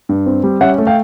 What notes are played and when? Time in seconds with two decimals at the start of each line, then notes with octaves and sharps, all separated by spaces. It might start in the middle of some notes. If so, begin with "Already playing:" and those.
0.09 G2
0.26 C4
0.44 G3
0.61 C#4 E5 F#5
0.78 A3
0.87 F5 G5